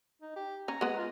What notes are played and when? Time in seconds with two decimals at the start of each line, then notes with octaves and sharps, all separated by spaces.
0.22 D#4
0.36 G4
0.68 C#4 A#5
0.81 G#3 B3
0.98 F4